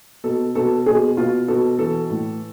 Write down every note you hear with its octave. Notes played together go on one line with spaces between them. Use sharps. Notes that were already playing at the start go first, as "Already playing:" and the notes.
B2 A4
B2 A4
B2 G#4
B2 F4
B2 A4
E3 A4
A2